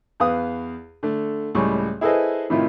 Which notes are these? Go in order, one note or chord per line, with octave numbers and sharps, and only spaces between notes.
E2 B4 F5 D#6
D3 A3
C#2 A2 G3 C#6
E4 G#4 A4 B4 C5 D#5
A2 C3 D#3 E4 F4